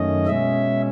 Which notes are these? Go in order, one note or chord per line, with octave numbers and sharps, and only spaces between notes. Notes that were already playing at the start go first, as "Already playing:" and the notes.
Already playing: F#2 D#3 A3 C#4 D#5
B2 G#3 C#4 E5